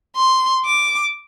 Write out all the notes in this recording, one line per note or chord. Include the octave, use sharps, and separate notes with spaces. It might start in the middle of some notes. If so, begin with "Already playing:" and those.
C6
D6